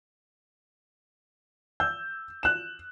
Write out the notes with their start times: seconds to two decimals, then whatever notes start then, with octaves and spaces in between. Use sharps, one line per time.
1.80 E6 G6
2.43 F#6 E7